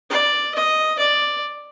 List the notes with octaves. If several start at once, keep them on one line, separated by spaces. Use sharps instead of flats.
D5
D#5
D5